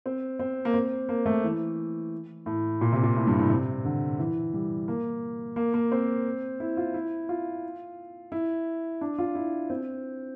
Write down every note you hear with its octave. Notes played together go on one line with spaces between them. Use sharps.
C4
C4
A#3
C4
A#3
A3
E3
A2
A#2
C3
A#2
A2
G2
A2
C3
D3
E3
G3
A#3
A#3
A#3
C4
E4
F4
E4
F4
E4
D4
F4
E4
C4